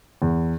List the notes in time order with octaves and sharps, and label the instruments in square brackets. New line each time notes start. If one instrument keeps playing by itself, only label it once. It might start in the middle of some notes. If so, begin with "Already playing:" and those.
[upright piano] E2